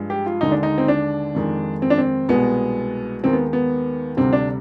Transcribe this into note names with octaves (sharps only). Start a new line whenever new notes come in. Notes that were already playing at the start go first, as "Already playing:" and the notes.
Already playing: G2 F3 G#3
G4
F4
D#2 D3 G#3 D#4
D4
D#4
C4
D4
F2 D#3 G#3
C4
D4
C4
C2 B2 G#3 B3
D#2 D#3 G#3 C4
B3
B3
D2 C3 G3 C4
D4